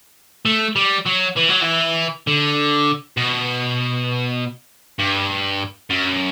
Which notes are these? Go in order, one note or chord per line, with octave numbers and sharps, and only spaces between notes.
A3
G3
F#3
E3
F#3
E3
D3
B2
G2
F#2